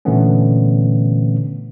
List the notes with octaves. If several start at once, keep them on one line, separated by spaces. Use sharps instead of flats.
A#2 D3 E3 A3 B3 C#4